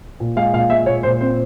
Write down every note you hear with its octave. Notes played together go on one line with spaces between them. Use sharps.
A#2
G#3 F5
A#2 F5
G#3 E5
A#2 C#5
A#2 C5
C4 C5